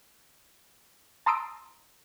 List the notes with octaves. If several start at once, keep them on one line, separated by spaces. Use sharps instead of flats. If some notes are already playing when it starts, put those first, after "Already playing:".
A5 A#5 C6 D#6 E6 D7